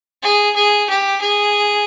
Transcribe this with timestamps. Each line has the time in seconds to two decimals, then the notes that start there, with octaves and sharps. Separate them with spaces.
0.23 G#4
0.56 G#4
0.89 G4
1.21 G#4